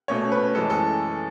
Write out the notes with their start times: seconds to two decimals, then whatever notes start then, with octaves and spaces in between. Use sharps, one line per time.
0.08 B2 A3 C#4 C#5
0.32 B4
0.55 F#2 E3 G#3 C#4 A4
0.70 A4